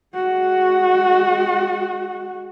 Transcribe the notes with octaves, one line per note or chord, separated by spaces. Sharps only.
G#3 F#4